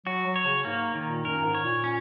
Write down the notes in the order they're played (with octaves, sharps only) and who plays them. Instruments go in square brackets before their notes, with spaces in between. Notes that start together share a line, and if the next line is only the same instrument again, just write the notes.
[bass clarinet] F#3 [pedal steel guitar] F#4
[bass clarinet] F#3
[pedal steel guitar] C#5
[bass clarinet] C#3
[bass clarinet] G#2 [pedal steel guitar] A#3
[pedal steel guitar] D#3
[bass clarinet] A#2
[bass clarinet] F#2 [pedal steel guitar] A#4
[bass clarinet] G#2
[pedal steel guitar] C#5
[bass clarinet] A#2
[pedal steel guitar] C#4